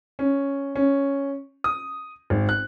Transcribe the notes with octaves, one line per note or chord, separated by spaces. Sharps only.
C#4
C#4
D#6
G#1
F#6